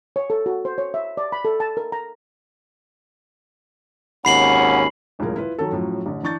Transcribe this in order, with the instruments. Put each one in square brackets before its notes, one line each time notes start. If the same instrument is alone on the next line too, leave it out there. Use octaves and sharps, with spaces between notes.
[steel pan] C#5
A4
F#4
C5
C#5
E5
D5
B5
A4
A5
A#4
A#5
[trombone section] G#1 D#2 C#4 [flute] F#5 [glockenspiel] B5 C7 F#7
[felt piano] D#1 C#2 A2 F3 G#4 A#4
E4 F4 B4
D#3 F#3 A4
F#2 A2 F3 F#3
A1 D3
E3 D4 C#6 G6 A6